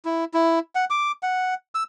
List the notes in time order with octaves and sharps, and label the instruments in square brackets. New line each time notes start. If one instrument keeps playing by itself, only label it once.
[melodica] E4
E4
F#5
D6
F#5
E6